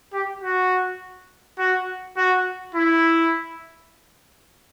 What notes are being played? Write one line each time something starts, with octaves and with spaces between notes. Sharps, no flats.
G4
F#4
F#4
F#4
E4